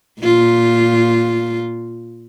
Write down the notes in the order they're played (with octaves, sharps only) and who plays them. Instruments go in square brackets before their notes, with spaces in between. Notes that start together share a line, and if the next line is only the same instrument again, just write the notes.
[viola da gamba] A#2 F4